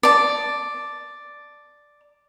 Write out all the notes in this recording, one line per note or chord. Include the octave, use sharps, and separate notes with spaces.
D5 A5